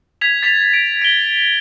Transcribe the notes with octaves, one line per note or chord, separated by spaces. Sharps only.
G#6 B6 F7
A6 B6 F7
D7
D7 G7